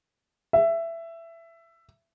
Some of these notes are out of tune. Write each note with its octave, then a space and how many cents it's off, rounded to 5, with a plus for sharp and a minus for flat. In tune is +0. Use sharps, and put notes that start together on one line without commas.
E5 +15